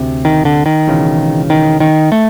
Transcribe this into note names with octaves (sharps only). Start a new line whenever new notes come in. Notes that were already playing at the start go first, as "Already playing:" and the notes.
Already playing: D2 C3
D#3
D3
D#3
E1 E2 C#3
D#3
D#3
A3